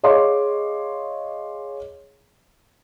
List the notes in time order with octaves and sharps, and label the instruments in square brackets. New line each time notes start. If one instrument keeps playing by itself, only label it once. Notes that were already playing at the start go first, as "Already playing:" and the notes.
[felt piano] G#4 C#5 D#5 F5 C6 D6